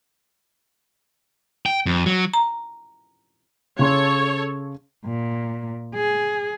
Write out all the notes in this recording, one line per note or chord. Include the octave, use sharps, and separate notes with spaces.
G5
F2
F#3
A#5
C#3 A4 C#5 C6 G#6
A#2
G#4